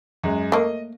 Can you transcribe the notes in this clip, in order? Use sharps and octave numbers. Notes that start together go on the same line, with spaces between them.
F#2 G#3
A3 A#3 D#5